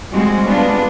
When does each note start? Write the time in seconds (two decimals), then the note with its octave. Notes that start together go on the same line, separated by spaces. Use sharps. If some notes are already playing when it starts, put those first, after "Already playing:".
0.12 G3 G#3 C4 F#4
0.47 G#3 B3 D4 F4